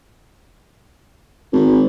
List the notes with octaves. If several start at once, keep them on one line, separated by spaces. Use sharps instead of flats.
G#1